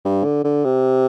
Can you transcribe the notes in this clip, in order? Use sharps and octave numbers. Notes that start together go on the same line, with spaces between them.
G2
D3
D3
C3